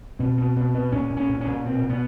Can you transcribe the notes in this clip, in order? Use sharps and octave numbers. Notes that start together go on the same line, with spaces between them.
B2 C4
B2
B2
B2
A#2 C#4
A#2
C#4
A#2
C#4
A#2
B2 C4
B2
B3